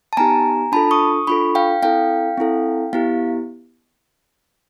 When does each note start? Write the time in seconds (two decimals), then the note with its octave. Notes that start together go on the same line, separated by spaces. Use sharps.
0.13 A5
0.17 B3 D#4 G4 G#5 A#5
0.72 D4 F4 A4 A5 B5
0.91 C#6 D#6
1.27 D4 F4 A4 B5 C#6
1.55 F5 G5
1.82 C4 E4 A4 F5 G5
2.38 C4 E4 A4
2.93 B3 E4 G4 F5